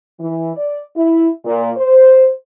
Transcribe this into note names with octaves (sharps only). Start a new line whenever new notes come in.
E3
D5
E4
A#2
C5